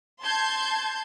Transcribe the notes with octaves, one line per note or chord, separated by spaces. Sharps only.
A5 C6 G6 G#6